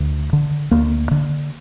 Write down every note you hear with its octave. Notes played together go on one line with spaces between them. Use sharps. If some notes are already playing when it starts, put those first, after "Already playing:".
Already playing: D2
D3
D2 A#3
D3